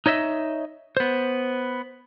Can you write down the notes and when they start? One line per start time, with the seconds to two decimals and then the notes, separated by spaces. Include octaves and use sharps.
0.06 D#4 C#5 D#5 E5
0.97 B3 C5